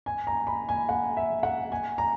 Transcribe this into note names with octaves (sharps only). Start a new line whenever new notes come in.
G#5
A#5
B5
G#5
F#5
E5
F#5
G#5
A#5